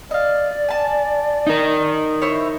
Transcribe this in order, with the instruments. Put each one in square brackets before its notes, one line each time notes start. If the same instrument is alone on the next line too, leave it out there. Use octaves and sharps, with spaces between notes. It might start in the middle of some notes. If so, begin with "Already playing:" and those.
[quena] D5 [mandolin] D#5 F5
[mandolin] G#5 A5
[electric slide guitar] D#4 A#4
[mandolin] E4 C5 C#5